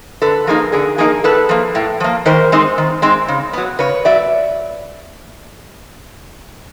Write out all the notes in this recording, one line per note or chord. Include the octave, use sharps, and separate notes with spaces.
D3 A4 B4
F3 A#3 D#4 G#4 A#4
D3 G#4 A#4
F3 A#3 D#4 G#4 A#4
A2 A4 B4
F3 A#3
A2
F3 A#3
D#3 A#4 C5
G#3 C4 D#4
D#3
G#3 C4 D#4
C#3
F#3 B3
C#3 B4 C#5
F#3 B3 D5 E5